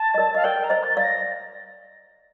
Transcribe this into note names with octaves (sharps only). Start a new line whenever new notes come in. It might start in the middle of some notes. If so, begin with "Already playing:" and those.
Already playing: A5
D#5
A#4 D5
D#5 F5
A#4 D5 G5
A#5
C5 D#5
A6
D5 F5 A6
A#6